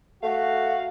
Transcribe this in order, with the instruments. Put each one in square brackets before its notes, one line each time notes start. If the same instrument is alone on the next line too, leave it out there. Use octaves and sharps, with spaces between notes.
[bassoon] A3 [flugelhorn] F#4 [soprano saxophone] F5